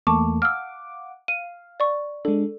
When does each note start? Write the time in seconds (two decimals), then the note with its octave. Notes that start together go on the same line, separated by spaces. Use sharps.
0.07 E2 A3 A#3 A5 C#6 D6
0.42 F5 F#5 D6 E6 F6
1.28 F5 D#7
1.80 D5 C#6
2.25 G#3 D4 A4